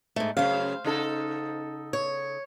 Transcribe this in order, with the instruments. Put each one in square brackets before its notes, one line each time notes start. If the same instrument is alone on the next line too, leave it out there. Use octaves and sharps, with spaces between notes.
[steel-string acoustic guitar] G#2 A3
[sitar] F#2 C#3 [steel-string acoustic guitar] C5 F5
[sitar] C#3 D#4 A4
[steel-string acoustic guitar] C#5